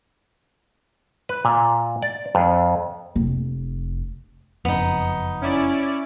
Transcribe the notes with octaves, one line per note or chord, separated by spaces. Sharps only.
B4
A#2
D5
F2
F1
F#1 F2 B3 D#4
C#4 E4 D5